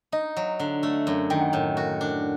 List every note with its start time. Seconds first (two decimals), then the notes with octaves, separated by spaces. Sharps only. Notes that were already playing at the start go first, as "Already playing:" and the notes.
0.12 D#4 D#5
0.37 F#3
0.60 D3
0.83 A3
1.07 F#2
1.30 D#3 G5
1.41 F#5
1.50 A2 G5
1.77 F#4
2.01 D4